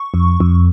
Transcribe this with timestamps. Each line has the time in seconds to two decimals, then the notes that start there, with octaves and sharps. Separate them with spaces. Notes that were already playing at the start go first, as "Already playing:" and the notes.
Already playing: C#6
0.14 F2
0.40 F2